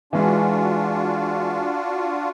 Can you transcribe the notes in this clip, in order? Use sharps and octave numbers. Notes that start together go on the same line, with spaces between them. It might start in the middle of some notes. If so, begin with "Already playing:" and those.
E3 G#3 D4 F4 F#4